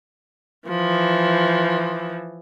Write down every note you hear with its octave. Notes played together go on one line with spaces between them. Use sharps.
E3 F3